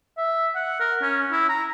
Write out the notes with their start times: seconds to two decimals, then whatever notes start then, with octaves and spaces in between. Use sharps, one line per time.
0.18 E5
0.55 F#5
0.80 A#4
1.01 C#4
1.32 E4
1.49 A#5